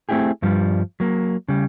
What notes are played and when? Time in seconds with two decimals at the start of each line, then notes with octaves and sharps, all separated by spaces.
0.09 A3 C4 E4 G4 G#4
0.42 G2 F3 G3
1.00 F#3 A#3
1.48 C#3 G3